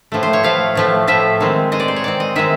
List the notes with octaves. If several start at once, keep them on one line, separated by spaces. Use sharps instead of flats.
A2 F3 A3
C5
C#5
A2 F3 A3 F5
A2 F3 A3
A2 F3 A3 E5
D#3 G#3 C4
D#3 G#3 C4 D#5
D5
C5
C#5
D#3 G#3 C4 D5
D#5
D#3 G#3 C4 E5